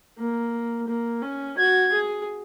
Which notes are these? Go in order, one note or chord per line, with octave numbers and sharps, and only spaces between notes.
A#3
A#3
C#4
F#4 G#6
G#4